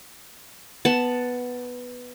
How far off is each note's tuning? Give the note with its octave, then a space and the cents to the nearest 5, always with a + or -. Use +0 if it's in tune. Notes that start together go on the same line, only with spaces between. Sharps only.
B3 +0 F#5 +5 A5 +0